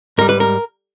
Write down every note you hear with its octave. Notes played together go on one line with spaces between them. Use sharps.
G#2 G3 A#4
B4
A#4